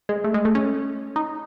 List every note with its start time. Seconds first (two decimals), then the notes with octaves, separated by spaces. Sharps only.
0.09 G#3
0.24 A3
0.34 G#3
0.45 A3
0.55 C#4
1.16 D#4